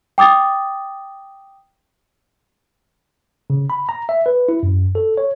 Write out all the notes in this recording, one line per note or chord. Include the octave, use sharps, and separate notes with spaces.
G5 D6 D#6 A6
C#3
B5
A#5
E5
B4
E4
F#2
A4
C#5